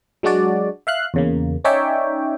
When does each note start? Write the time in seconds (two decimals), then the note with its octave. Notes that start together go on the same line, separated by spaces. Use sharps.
0.23 F#3 G#3 D4 F#4 D5
0.87 E5 F5 F#6
1.14 E2 C#3 A#3
1.65 C#4 D#4 C#5 D5 E5 G5